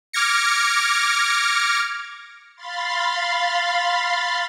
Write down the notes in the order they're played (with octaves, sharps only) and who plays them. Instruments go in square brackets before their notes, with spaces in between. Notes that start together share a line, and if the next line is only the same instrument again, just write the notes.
[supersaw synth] D6 F6 G#6 A#6 C#7
[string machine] F5 B5 C6 A6